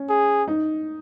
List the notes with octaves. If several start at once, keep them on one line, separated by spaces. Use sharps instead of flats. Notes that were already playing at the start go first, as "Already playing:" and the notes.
Already playing: C#4
G#4
D#4